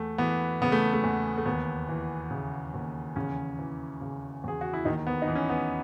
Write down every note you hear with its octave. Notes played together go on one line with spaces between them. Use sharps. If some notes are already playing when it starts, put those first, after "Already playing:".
Already playing: E2 A3
E3 B3
C#3 B3
A3
A3
E2
A3
D#2 B3
E3
C#3
D#2
E2 C#3 C#4
E3
C#3
E2 G#4
F#4
E4
D#2 D#3 D#4
B3
D#4
E3
C#4
B3